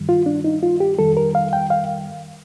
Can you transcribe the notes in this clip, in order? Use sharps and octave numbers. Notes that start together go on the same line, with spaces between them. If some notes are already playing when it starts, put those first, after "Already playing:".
Already playing: G2 D#3 G3
F4
D4
D#4
F4
G4
F2 D#3 G3 A4
A#4
F5
G5
F5